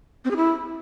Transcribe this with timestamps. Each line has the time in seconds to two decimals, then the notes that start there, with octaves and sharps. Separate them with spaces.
0.25 C4
0.31 G#4
0.36 E4